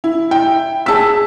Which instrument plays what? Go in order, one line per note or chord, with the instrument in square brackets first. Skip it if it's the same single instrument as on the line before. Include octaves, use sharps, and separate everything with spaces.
[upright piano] E4
[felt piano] G5
[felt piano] G#4 B6 [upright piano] A5 E6